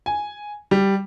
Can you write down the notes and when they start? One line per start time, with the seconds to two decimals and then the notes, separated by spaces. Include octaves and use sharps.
0.06 G#5
0.71 G3